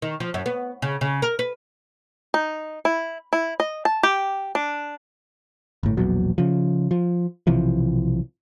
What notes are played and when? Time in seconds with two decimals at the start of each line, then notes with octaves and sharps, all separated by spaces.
0.02 D#3
0.20 F3
0.34 F#2
0.46 B3
0.82 C#3
1.01 C#3
1.22 A#4
1.39 B4
2.34 D#4
2.85 E4
3.33 E4
3.60 D#5
3.85 A5
4.03 G4
4.55 D4
5.83 G1 A2
5.97 E1 A#1 E2 F#3
6.38 C#3 F3
6.91 F3
7.47 B1 C3 E3 F3